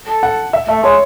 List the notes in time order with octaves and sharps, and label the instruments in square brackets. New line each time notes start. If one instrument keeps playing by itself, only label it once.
[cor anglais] A4
[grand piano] F#5
E5
[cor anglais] A3 [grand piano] E5
[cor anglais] G#3 [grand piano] C#5